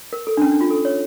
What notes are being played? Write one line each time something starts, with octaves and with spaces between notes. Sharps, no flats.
A#4
A4
D4
C#4
D4
F4
A4
C#5